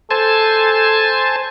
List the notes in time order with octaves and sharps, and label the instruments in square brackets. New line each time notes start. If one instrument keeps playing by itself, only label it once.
[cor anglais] A4 [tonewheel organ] C5 G#5 A5